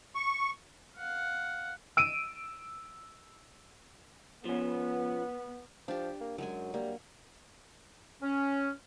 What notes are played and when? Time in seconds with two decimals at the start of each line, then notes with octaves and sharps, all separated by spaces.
0.15 C#6
0.98 F5 F#5
1.97 E6 D7 D#7
4.45 F3 B3 C#4
5.88 F3 D4 G4
6.21 A#3
6.38 F#2 F#3 G#3 G#5
6.74 G3 A#3
8.21 C#4